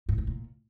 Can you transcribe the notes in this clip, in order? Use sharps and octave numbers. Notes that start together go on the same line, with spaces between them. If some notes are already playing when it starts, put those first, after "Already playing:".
G#2
A2
A#2